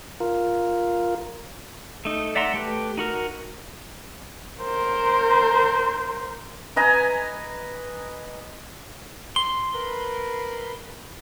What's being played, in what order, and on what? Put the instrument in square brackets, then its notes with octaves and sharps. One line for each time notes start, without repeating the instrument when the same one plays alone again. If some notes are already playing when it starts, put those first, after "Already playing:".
[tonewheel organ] F4 A#4
[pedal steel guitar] A3 D#4
D5 E5 F#5 A#5 C6
A3 G4 B4
D#4 F#4 A#4
[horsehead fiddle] A#4 C5
[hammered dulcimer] B4 D#5 G#5 A#5
[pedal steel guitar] C6 [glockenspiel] G7
[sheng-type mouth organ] A#4 B4 B5